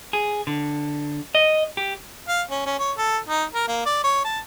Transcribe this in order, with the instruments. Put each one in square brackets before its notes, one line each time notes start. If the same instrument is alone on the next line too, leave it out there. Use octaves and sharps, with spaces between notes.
[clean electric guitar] G#4
D3
D#5
G4
[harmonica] F5
C#4
C#4
C#5
A4
D#4
A#4
A#3
D5
C#5
A5